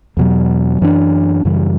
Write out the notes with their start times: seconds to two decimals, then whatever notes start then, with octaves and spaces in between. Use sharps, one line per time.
0.17 E2 B2 F#3
0.81 F#2 E3 B3 D4
1.45 F#2 C#3 E3 G3